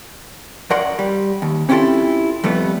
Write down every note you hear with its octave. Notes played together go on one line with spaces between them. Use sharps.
F#2 F#3 A#4 D5 F#5 C6
G3
D#2
C4 C#4 E4 F4 G4 A4
F2 G3 A3 B3